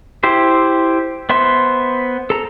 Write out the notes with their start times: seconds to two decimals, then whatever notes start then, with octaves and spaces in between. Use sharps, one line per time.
0.23 E4 G4 C5
1.30 B3 C5 E5 C6
2.30 A4 A#5